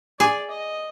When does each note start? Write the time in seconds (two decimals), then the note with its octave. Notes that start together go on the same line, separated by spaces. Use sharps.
0.20 G#4 D5
0.50 D#5